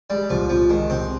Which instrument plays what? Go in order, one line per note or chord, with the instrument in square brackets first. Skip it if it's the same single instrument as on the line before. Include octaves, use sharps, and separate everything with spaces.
[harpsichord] G3 [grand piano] G#3
[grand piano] C2 [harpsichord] F3
[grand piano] C2 [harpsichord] F3
[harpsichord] D#3 [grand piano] G#3
[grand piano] C3 [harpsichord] C4